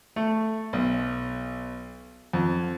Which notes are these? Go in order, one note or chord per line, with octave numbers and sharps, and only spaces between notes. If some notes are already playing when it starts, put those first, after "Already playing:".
A3
B1
F2